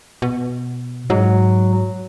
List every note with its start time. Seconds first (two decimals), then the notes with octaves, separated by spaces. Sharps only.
0.22 B2
1.10 G#2 F#3